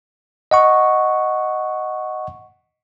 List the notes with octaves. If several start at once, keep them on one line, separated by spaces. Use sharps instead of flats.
D#5 F#5 C#6